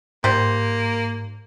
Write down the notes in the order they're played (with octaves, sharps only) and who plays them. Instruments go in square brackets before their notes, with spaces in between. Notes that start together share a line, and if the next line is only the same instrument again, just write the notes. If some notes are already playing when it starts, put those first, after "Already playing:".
[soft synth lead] G#2 [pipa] G3 C5 [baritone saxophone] A#3